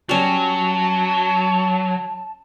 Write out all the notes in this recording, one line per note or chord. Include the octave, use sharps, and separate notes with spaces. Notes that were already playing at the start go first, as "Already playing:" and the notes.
F#3 G3 C#4 A5